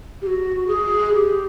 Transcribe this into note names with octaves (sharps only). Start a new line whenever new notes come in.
G4
F#4
G#4
G4